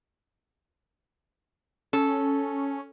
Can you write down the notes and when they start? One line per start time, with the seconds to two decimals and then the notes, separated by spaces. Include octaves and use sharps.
1.93 C#4 A4